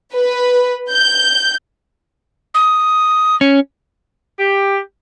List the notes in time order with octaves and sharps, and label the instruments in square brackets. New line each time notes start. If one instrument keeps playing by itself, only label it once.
[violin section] B4
G6
[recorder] D#6
[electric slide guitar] C#4
[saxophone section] G4